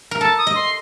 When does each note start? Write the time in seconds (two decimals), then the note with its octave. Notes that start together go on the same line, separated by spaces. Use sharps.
0.11 A#4
0.21 A4 A5
0.38 D#6
0.47 D#5
0.55 C6